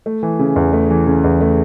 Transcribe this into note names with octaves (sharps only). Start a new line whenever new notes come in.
A3
E3
C#3
E2
A3
E3
C#3
E2
A3